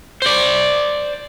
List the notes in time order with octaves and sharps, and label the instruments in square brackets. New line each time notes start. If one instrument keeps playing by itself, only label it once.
[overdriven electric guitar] C5 D5